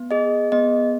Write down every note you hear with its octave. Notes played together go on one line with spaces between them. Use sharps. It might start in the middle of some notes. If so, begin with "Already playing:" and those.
Already playing: B3
G#4 D#5
B3 D#5